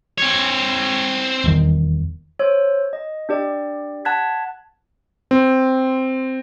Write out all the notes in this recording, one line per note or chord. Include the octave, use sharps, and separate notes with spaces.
C4 C#5
D#1 E2 D#3
C5 C#5 E6
D#5
D4 G4 D5
F#5 A5 F#6 G#6 B6
C4